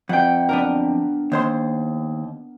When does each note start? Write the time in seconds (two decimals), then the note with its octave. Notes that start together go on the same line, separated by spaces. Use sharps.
0.09 F2 F#5 G5
0.49 B3 D4 A#4
1.32 D#2 C5 C6